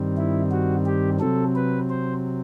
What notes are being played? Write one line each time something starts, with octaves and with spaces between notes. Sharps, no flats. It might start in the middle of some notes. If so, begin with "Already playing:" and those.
Already playing: G2 D#3 G3 C4
E4
F#4
G4
C3 F#3 C4 A4
B4
C5